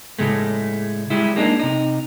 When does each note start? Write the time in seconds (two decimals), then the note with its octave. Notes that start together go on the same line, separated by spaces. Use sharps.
0.19 A2 C#3 G#3 A3
1.10 G3 G#3 E4
1.36 G#3 A#3 D4 D#4
1.60 C3 D#4